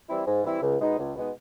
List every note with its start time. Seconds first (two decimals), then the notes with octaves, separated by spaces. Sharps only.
0.08 E3 G3 C4 E4
0.27 G#2
0.44 E3 G3 C4 E4
0.62 C#2
0.81 B2 G#3 B3 D#4
0.98 C#2
1.16 B2 G#3 B3 D#4